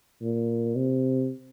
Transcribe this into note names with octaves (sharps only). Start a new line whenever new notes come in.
A#2
C3